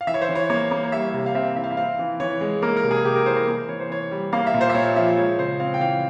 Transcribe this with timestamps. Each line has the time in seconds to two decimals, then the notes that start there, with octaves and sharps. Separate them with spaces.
0.01 F5
0.07 E3 E5
0.14 C#5
0.21 C5
0.29 E3
0.35 C#5
0.50 A#3 C#5
0.71 A#3
0.84 C#5
0.92 G3 E5
1.14 C3
1.26 F5
1.35 C4 E5
1.56 E3 E5
1.64 F5
1.71 E5
1.77 C4 F5
1.99 E3
2.20 E3 C#5
2.41 G#3
2.62 A#3 A#4
2.77 A#4
2.84 C3
2.91 G#4
3.05 C3 G4
3.16 A#4
3.26 E3 C5
3.37 A#4
3.48 A#3
3.69 E3 C#5
3.80 C5
3.90 E3 C#5
4.11 G3
4.33 A#3 F5
4.47 E5
4.54 A#2
4.61 C5
4.70 E5
4.75 A#2 C#5
4.96 F3 E5
5.17 G#3 C#5
5.39 C#3 C5
5.60 C4 F5
5.74 G5
5.81 E3 F5